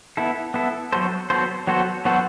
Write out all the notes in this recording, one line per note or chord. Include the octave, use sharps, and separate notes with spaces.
B3 E4 A4
B3 E4 A4
F#3 B3 F#4 A4 C5
F#3 B3 F#4 A4 C5
F#3 B3 F#4 A4 C5
F#3 B3 F#4 A4 C5